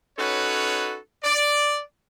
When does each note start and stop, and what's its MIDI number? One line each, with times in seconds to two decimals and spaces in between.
0.18 0.97 61
0.18 0.97 63
0.18 0.97 66
0.18 0.97 69
0.18 0.97 71
0.18 0.97 73
1.24 1.81 74